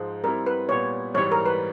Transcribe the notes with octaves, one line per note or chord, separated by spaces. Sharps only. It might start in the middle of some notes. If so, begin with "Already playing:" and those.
Already playing: G#2 F3 G#3
G3 C4 E4 A#4
B4
A#2 G3 B3 C#5
G#2 E3 G3 C#5
A#4
B4